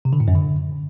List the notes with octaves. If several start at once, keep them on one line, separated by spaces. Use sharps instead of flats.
C3
D3
A2
F#2
D3